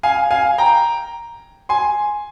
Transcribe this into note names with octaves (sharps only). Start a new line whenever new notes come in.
F5 G#5
F5 G#5
G5 A#5
G#5 C6